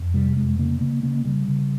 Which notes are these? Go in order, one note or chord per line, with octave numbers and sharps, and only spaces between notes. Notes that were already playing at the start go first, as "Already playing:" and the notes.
Already playing: F2
C3 G3
F2 G#3
C#3 A#3
C#3 A#3
C#3 A#3
C#3 G3
C#3